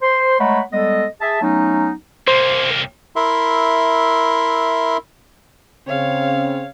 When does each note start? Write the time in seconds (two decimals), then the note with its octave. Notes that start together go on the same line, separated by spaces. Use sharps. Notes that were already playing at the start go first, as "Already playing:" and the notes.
0.02 C5 C6
0.40 G#3 A3 C#5 F#5 A#5 B5
0.72 G3 G#3 B3 A4 D#5
1.21 G#4 E5 A5
1.42 F#3 A3 B3 C#4 D#4
2.28 C2 A#3 C5
3.16 E4 A#4 E5 C6
5.87 C#3 C4 C#5 F5